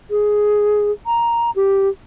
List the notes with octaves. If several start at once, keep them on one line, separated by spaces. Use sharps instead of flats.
G#4
A#5
G4